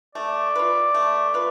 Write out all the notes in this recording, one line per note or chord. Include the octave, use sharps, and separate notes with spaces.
A3 D5
F4 B4
A3
F4 B4